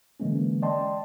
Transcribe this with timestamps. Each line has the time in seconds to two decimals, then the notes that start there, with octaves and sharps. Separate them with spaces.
0.20 D3 E3 G#3 A#3 C#4
0.62 D5 D#5 G5 A5 C6